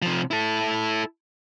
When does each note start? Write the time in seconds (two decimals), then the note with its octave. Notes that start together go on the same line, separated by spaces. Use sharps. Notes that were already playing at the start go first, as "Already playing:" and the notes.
0.02 C3 F3
0.31 E4 A4